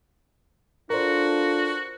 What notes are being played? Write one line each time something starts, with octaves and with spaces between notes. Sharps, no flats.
D4 F4 F#4 A4 A#4 C5